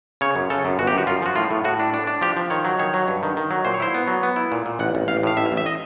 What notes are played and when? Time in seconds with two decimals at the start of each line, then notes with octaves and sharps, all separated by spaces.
0.21 C#3 C#5
0.36 F#2
0.50 C#3 A4
0.65 F#2
0.79 G1 F#4
0.87 G4
0.92 F#2
0.98 F#4
1.07 F#2 F4
1.22 F3 F#4
1.36 A2 F4
1.51 A2
1.64 A2 F#4
1.79 D4
1.94 D4
2.07 D4
2.21 F3 G4
2.37 F3
2.50 D#3 C#5
2.65 F#3
2.79 D#3 C#5
2.94 F#3
3.08 G2
3.23 D#3
3.37 D#3
3.51 F#3
3.65 A#2 C5
3.74 C#5
3.80 E4 C5
3.94 B3
4.08 F#3
4.23 B3
4.36 E4
4.52 A#2
4.66 A#2
4.79 A1 F#5
4.95 A1
5.08 A1 F5
5.23 A2 F5
5.37 A1 E5
5.52 A1
5.57 E5
5.66 D#5